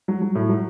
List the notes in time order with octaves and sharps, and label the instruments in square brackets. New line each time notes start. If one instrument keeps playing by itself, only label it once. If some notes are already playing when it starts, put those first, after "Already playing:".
[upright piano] F#3
F#3
A2
F#3